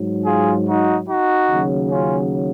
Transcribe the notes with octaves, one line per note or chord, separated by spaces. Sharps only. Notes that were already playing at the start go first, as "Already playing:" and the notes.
Already playing: G#2 F#3
F4 G#4
D#4 F#4
D#4 F#4
D#2 C#3 F#3
C#4 F4